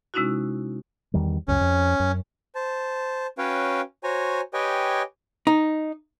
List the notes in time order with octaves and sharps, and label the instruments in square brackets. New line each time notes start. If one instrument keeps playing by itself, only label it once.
[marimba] C3 G#3 C#4 D#4 E4 F#4
[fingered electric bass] E2 D#3 G3
[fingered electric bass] C#2 F#2 [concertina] C#4
[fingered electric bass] F2
F#2
[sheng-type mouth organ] C5 A5
C#4 F#4 B4 C#5 F5 G5
F#4 C5 C#5 G#5 A#5
G4 B4 C#5 D#5 G5 G#5
[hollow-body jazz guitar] D#4